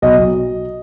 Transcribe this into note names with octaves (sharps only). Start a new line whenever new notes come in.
B1 D#5
B1